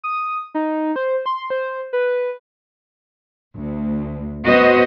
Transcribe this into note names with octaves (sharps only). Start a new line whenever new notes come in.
D#6
D#4
C5
C6
C5
B4
D2
B3 F#4 C5 D#5